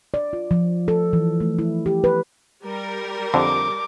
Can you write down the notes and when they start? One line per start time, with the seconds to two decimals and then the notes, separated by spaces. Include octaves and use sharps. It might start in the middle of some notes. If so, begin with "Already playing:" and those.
0.14 D5
0.33 F4
0.51 F3
0.88 A4
1.13 E3
1.40 A3
1.59 E4
1.86 G4
2.04 B4
2.63 G3 A#4
3.34 F2 D3 D6